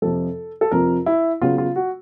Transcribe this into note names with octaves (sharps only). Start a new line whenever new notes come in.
F2 C3 F3 A4
A4
F2 C3 F3 A#4
E4
C#3 F#3 B3 F4
F4
F#4